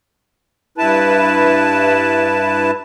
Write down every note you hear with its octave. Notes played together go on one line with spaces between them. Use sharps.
G2 E4 B4 A5